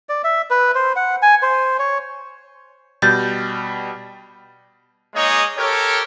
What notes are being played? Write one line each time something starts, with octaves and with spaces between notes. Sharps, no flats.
D5
E5
B4
C5
F#5
G#5
C5
C#5
B2 G3 G6 A6
G#3 A#3 D#4 G#4 C#5 D#5
G4 A4 A#4 C#5